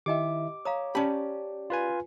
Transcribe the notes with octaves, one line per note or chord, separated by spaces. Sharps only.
D#3 E4 G4 D#5 E5 G5 D6
C#5 F5 A#5 D#6
C#4 G4 C#5 D5 A5 B5
F4 B4 G#5